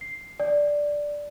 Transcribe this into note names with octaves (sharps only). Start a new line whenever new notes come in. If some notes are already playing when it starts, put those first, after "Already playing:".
C7
D5